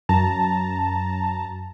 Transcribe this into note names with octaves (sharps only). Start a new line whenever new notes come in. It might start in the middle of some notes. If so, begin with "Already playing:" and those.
F#2 A5 A#5